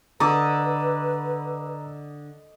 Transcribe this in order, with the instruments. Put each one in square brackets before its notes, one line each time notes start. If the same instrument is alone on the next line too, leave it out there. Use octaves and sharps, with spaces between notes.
[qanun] D3 [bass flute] B4 [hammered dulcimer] D#5 D6 [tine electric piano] A#5 E6